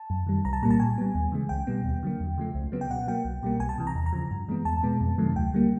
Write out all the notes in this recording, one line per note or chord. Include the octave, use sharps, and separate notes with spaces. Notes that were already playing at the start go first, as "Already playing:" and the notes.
Already playing: A5
F#2
D#3 G3
C2 A#5
A5
A#2 G3 A#3 A#5
A5
A#2 G#5
G3 B3
D#2
C#3 E3 G#3
C#2 G5
B2 G3 B3
D#2
D3 F#3 A#3
E2
C#3 F3 A3
C#2
C#3 F#3 B3
G5
B2 F#5
F#3 A#3 G5
C2
B2 G3 A#3
C2 G#5
A5
C3 E3
A#5
E2
A#5
C#3 F3
G2
E3 G#3 B3
E2 A5
B2 G#3 B3
F2
C3 D#3 F#3 A3
D2 G5
D3 G3 A#3